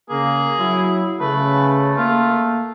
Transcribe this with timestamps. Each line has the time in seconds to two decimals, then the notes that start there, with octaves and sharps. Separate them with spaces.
0.10 C#3 A#3 G#4
0.59 F#3 E4
1.20 C#3 A3 B4
1.97 A#3 F4